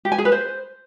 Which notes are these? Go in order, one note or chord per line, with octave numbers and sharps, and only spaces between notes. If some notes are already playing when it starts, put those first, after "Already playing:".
G4
G#5
G#4
B4
C5